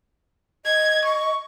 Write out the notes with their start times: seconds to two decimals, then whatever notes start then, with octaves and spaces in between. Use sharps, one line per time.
0.66 D#5 G#6
1.05 C#6